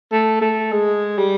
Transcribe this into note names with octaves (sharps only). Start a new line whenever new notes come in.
A3
A3
G#3
G3